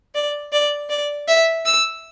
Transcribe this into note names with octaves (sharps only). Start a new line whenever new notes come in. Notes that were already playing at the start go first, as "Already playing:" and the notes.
D5
D5
D5
E5
E6